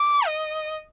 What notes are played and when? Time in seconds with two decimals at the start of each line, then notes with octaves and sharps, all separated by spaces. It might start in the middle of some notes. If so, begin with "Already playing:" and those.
Already playing: D6
0.27 D#5